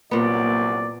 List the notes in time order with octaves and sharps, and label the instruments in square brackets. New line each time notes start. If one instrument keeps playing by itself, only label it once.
[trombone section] C2 F#3 [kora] A#2 B3 [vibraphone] A#3 [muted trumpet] D5